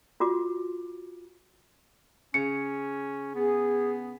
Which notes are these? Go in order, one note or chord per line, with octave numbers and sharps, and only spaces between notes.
F4 F#4 D6
C#3 C#4 C#7
B3 G#4